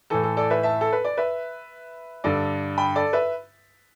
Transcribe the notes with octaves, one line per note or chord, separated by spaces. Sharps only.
A2 E3 A4
A4
A4 D5
B4 E5
E5 A5
A4
B4
D5
B4 E5
G2 D3 A4 D5
G5 B5
A4 D5
B4 E5